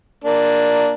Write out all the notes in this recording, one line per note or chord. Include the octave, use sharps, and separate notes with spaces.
A#3 D4